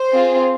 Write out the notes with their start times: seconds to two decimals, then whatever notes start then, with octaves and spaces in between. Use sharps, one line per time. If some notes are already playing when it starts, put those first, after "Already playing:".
Already playing: C5
0.11 C4 F4 G#4